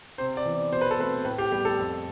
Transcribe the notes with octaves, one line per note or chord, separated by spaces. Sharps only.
C3 C5
D5
E3 B3
B2 C5
B4
A4
A3 C4 B4
A2 B4
G4
G3 B3 G4
A4
F2